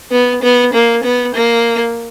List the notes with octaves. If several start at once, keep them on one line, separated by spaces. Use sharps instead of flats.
B3
B3
A#3
B3
A#3